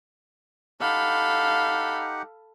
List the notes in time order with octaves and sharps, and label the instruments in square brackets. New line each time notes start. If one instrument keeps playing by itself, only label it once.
[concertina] D#4 G4 F#5 [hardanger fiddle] A4 B5 [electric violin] F5